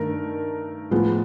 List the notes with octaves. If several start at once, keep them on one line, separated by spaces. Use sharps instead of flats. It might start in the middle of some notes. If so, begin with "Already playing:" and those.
Already playing: G2 D#3 A3 A#4
A2 F3 G#3 B3